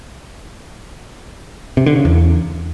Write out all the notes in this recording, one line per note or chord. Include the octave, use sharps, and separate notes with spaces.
C3
D3
C#3
E2